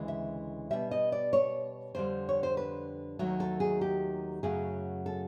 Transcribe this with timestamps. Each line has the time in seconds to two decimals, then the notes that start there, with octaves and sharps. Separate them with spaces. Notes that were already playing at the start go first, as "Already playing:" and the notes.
Already playing: D2 C#3 E3 G#3
0.08 E5
0.71 B2 G3 E5
0.91 D#5
1.12 D5
1.33 C#5
1.95 F2 D3 G3 C5
2.29 C#5
2.43 C5
2.57 B4
3.19 D#2 D#3 F#3 A3
3.40 A4
3.60 G#4
3.81 G4
4.43 F#2 C#3 F#3 A3 G#4
5.06 A4